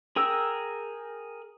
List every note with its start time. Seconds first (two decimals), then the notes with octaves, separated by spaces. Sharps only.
0.16 G#4 A#4 G5 E6